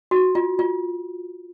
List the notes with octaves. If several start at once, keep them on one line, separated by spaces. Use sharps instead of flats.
F#4
F4
F4